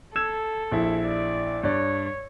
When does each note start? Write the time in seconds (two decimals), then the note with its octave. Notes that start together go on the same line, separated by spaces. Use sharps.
0.16 A4 E6 G#6 E7
0.72 A#1 E4
1.06 D5
1.63 G2 C#5 D5